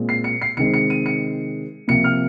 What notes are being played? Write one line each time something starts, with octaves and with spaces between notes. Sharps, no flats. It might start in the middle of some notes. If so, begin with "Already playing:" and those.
Already playing: A#2 G#3 C4
C7
C#7
C7
C3 D#3 G#3 C4 C#7
C#7
D#7
C#7
C3 F3 A#3 C#7
F6